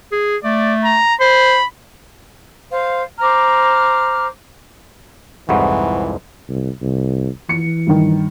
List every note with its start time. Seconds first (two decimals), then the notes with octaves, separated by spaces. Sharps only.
0.12 G#4
0.44 A3 D5
0.84 A#5
1.20 C5 B5
2.70 C5 F5
3.19 C5 A#5 D6 F6
5.49 C2 F2 G#2 E3 F#5 B5 C#6
6.49 C2
6.82 C2
7.49 E3 C#7
7.87 G2 D#3